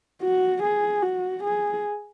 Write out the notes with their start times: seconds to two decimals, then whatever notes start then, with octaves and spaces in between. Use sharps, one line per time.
0.22 F#4
0.63 G#4
1.03 F#4
1.43 G#4